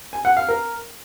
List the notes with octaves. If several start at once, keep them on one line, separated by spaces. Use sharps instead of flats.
G#5
F#5
F5
A#4